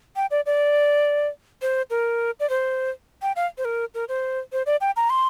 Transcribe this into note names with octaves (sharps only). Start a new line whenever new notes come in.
G5
D5
D5
C5
A#4
D5
C5
G5
F5
C5
A#4
A#4
C5
C5
D5
G5
A#5
C6